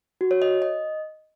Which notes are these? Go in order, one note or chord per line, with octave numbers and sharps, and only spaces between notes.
F#4
C#5
D#5
D#5